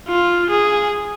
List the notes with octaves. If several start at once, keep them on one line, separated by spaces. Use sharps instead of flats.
F4
G#4